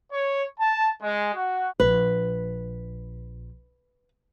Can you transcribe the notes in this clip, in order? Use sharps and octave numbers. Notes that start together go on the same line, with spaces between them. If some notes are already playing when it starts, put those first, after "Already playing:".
C#5
A5
G#3
F#4
A#1 B4